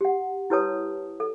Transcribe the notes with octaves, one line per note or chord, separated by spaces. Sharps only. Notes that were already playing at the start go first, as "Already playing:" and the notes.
G4 F#5
E4 G4 B4 C#5 A5 D#6
A4